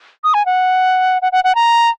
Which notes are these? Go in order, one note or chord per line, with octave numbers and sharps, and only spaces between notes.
D#6
G#5
F#5
F#5
F#5
F#5
A#5